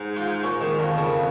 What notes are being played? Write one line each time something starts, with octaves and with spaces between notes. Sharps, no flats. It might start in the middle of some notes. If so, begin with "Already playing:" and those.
Already playing: G#2
F4
A#2 C#4
G#2 D#3
F2 A#2
C#3